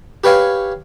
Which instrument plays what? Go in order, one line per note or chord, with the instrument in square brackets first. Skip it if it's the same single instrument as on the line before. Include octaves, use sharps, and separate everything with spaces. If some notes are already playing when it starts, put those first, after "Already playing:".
[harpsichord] G4 B4 C#5 F5 G#5